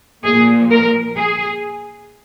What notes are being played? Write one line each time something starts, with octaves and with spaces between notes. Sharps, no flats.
A#2 F3 A#3 G#4
A#4
G#4